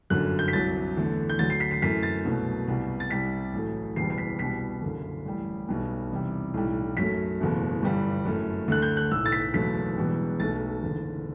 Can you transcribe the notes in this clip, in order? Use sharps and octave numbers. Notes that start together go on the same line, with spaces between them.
G1 F#2 D3 F#3 F#6
G6
B6
C2 C3 F#3 A6
E2 D3 A3
G6
D2 D3 F#3 A6
C7
B6
C7
F#2 E3 A3 B6
A6
C2 B2 F#3 A3
C2 B2 G3
A6
C2 C3 G3 B6
A1 A2 F#3 A3
F#1 E2 B2 G3 C7
C7
B6
C2 B2 G3 B6
F#1 F#2 D3
A1 A2 G3
B1 B2 G3
E2 C3 G3
B1 A2 E3 G3
F#2 F#3 A3 B6
F#1 E2 B2 A3
G1 G2 E3 G3
F#2 E3 A3
D2 D3 A3 F#6
G6
F#6
B1 A2 E3 E6
A6
B6
F#1 E2 B2 F#3 A3 B6
E1 E2 B2 G3
B1 B2 A3 A6
F#1 E2 D3